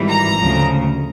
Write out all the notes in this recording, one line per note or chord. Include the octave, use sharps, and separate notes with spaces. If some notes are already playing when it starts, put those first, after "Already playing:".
Already playing: G#1 G#2 E3 G3
A#5
D2 C#3 F3